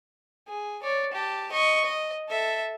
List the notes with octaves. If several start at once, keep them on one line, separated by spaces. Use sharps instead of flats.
G#4
C#5 D5
G4 A5
D#5 C#6
D#5
A4 E5